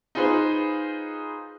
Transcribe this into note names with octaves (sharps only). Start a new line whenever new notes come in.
D#4 F4 G#4 B4 C5